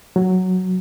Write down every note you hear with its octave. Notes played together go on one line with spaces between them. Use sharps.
F#3